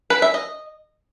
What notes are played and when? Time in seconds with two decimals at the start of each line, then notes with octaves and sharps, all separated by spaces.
0.10 B4
0.22 E5
0.34 D#5